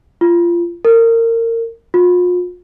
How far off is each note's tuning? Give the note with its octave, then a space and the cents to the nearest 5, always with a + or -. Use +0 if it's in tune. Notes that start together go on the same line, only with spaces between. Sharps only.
F4 -25
A#4 -30
F4 +40